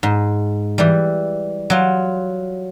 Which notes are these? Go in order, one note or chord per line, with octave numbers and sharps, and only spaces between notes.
G#2
E3 G3
F#3 F4